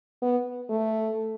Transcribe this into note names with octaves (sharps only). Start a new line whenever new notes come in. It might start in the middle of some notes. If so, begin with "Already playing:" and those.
B3
A3